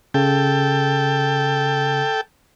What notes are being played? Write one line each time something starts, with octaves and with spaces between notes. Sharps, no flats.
C#3 A4 G5